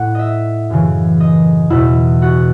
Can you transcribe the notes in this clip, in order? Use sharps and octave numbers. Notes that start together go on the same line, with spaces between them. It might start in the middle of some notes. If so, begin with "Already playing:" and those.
Already playing: A2 F#5
D#5 E5
F#2 C#3 E3
D#5
E2 B2 E4
F#4